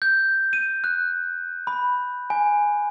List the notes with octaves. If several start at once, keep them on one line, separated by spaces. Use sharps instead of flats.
G6
D#7
F#6
B5
G#5